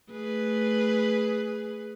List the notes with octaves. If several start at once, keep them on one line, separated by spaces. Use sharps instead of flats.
A3 G#4 B4